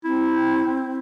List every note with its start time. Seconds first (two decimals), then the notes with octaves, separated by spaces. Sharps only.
0.05 C4 E4